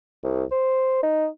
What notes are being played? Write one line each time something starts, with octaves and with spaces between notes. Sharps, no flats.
C2
C5
D#4